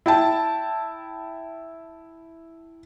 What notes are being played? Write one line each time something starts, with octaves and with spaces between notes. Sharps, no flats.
E4 G5 A5